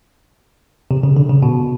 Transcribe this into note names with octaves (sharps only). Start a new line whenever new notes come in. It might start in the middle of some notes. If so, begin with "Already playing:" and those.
C3
C#3
D3
C#3
B2